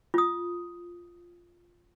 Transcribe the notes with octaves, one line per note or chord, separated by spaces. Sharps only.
F4 D#6